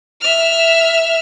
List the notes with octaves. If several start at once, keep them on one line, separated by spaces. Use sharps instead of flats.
E5 F6